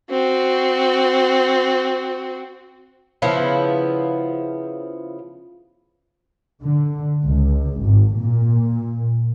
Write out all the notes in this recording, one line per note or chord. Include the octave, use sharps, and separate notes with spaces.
C4 F#4
C#3 F3 B3 E4
D3
C#2
G#1
A#2